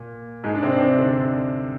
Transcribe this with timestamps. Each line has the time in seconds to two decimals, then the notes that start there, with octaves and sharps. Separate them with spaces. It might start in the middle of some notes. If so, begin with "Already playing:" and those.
Already playing: A#2
0.44 G#2 G#3
0.55 D4
0.62 C3 C4
0.72 D4
0.80 C3 C4
0.98 D3 D4